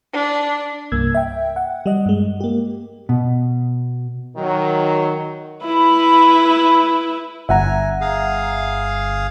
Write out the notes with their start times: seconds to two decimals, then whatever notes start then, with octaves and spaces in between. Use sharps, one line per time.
0.13 D4
0.92 C2 G2 A#3 E6 G#6
1.15 E5 G5
1.56 F#5
1.86 G3 D#5
2.06 G2 G#3
2.40 A#3 G4
3.09 B2
4.36 D#3 F#3
5.64 E4 B4
7.49 G1 E5 F#5 G#5 A#5
8.01 G#4 F5